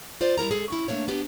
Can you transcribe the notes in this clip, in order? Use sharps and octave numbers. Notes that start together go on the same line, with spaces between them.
F4 C5 D5
G3 E4 A#4 A#5
G#3 G#4 A4
C#4 E4
A3 A#3 D4 C#5
B3 D4 G4